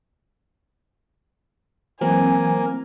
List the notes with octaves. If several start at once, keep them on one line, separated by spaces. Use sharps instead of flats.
E3 F#3 A#3 C4 G#5